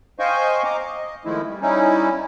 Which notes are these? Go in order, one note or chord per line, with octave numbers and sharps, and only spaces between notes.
C5 D#5 F5 G5 G#5 C#6
D#5 A#5 D6
D#5
D#3 F3 G#3 A3 E4
G3
G3 C#4 D#4 E4